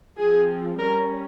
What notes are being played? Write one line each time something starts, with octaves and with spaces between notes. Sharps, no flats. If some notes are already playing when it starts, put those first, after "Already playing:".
F3 C4 G#4
G3 C#4 A#4